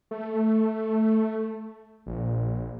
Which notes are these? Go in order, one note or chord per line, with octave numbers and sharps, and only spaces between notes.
A3
A#1